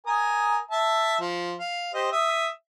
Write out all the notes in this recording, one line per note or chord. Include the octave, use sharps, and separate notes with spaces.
A#4 G#5 D#6
E5 A5
F3
F5
G4 C5 D#5
E5 D#6